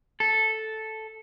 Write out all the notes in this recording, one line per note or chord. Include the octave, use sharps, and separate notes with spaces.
A4